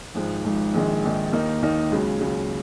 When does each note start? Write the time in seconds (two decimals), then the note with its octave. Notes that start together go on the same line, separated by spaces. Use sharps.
0.15 G#1 G#2 F3
0.45 G#1 G#2 F3
0.74 A#1 G#2 D#3 G#3
1.03 A#1 G#2 D#3 G#3
1.33 D#2 D#3 A#3 D#4
1.62 D#2 D#3 A#3 D#4
1.91 C#2 C#3 F#3
2.21 C#2 C#3 F#3